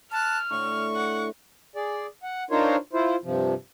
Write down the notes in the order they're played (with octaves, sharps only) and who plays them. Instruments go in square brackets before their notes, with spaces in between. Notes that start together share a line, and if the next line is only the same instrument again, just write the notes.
[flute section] A5 F#6 [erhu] F6
[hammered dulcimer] A2 D3 [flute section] C#6
[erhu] F#5
[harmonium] G#4 D5
F#5
D4 D#4 F4 A#4 C5 C#5
E4 F4 C5
G2 C3 F3